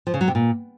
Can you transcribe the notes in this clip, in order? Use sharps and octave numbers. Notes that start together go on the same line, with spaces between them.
F3
C#3
F#3
C3
A#2